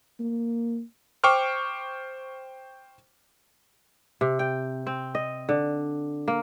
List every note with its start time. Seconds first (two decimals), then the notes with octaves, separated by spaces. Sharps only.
0.20 A#3
1.24 C5 G5 C#6 D6 F6
4.21 C3
4.39 G5
4.87 C4
5.15 D#5
5.49 D3
6.28 A#3